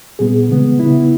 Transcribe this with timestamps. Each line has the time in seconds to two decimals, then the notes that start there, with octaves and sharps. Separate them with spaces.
0.19 A#2 G3 B3 G#4
0.49 C#3 E3 G#3 B3
0.79 C#3 G3 B3 E4